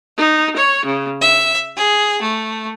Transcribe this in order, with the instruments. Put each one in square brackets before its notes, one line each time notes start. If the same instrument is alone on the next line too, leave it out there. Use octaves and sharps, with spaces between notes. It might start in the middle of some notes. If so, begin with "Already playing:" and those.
[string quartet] D#4
C#5
C#3
E5
G#4
A3